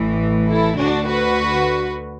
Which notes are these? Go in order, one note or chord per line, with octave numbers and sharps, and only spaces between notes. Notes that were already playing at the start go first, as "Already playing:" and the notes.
Already playing: A1 A2 E3
E4 A4
D2 D3 D4 F#4
F#4 B4